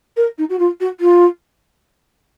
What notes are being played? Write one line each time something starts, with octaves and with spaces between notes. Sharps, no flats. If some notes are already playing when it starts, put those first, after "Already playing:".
A#4
D#4
F#4
F4
F#4
F4